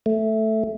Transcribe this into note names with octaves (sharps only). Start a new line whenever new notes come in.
A3